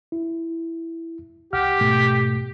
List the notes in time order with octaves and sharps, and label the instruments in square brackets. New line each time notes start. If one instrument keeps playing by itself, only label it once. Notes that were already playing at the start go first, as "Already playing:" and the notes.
[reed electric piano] E4
[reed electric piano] C2 F#5 F6 [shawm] G4
[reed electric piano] G#2 B2 A3